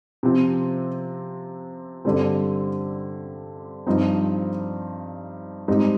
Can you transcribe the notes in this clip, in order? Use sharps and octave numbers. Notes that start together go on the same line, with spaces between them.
C3 F3 C4
G2 D3 G3 C4
G2 F3 C4 D#4
G#2 G3 C4 D#4